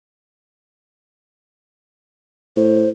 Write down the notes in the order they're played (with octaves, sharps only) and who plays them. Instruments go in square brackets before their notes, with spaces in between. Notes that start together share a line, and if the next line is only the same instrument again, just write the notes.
[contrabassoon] A2 [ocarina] C5